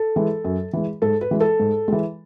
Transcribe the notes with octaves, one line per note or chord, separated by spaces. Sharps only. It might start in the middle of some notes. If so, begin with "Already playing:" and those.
Already playing: A4
E3 G#3
F#2
E3 G#3
G#2 A4
B4
E3 G#3
A4
G#2
E3 G#3